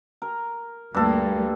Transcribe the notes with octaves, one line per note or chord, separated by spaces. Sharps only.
A#4
D2 G2 G3 A#3 A4